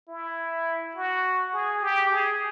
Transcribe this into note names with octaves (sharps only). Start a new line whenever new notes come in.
E4
F#4
G#4
G4
G#4